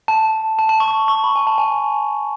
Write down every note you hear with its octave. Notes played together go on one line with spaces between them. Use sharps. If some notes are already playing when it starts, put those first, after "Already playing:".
A5
A5
A5
C#6
C#6
C#6
B5
G#5
A5
G#5